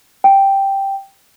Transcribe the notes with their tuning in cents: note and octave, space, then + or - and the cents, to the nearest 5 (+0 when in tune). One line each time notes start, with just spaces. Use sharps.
G5 +0